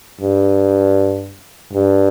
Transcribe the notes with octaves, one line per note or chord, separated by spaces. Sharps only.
G2
G2